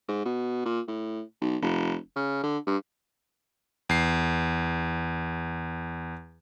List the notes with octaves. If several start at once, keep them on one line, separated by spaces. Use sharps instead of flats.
G#2
B2
A#2
A2
B1
F1
C#3
D3
G2
E2 C7